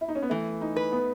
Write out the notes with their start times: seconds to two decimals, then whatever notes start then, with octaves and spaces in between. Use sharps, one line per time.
0.01 E4
0.08 D#4
0.15 C#4
0.22 B3
0.30 E3 A3
0.61 D#4
0.76 B4
0.92 B3